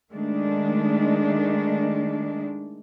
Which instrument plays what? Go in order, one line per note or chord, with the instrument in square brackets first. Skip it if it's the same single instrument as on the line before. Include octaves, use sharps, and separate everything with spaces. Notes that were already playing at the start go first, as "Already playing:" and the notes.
[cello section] D#3 G#3 A3 D4